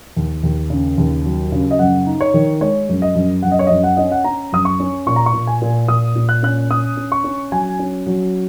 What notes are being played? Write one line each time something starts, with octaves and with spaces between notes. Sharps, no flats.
D#2
D#2
C#3
D#2
F#3
C#3
D#5
F#2 F#5
D#4
C#5
D#3
G#3 C#5
F#2
D#5
F#2
F#2 F#5
D#5
C#5
F#2 D#5
F#5
C#4 D#5
F#5
C#4 A#5
F#2 D#6
C#6
C#4
A#2 C#6
A#5
C#6
A#2
G#5
A#2
A#2 D#6
A#2
F#6
C#4 F#6
C#4 D#6
C#4
C#6
C#4
F#3 G#5
C#4
F#3